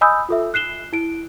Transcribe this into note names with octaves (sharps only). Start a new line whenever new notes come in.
D#5 G#5 B5 D#6 E6 G6
F4 A4 E5
F#6 C7 E7 G7
E4 D7